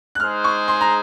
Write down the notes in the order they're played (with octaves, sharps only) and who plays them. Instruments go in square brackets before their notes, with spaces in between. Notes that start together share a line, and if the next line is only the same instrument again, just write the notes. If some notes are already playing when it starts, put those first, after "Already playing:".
[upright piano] F#6
[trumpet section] G#3 D#4 G#4 C5 [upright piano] F6
[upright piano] C#6
C6
A#5